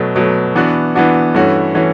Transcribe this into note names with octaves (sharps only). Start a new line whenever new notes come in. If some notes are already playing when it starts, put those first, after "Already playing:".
Already playing: B2 F#3 A3
B2 F#3 A3
E3 B3 D4 F#4
E3 B3 D4 F#4
G2 E3 A3 C#4 F#4
E3 A3 C#4 F#4